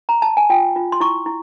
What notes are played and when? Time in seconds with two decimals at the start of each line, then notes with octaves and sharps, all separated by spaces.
0.09 A#5
0.22 A5
0.37 G#5
0.50 F4 G5
0.76 F4
0.92 C6
1.00 E4 C#6
1.26 E4